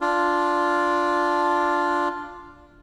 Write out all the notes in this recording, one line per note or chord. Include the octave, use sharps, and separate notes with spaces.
D4 F4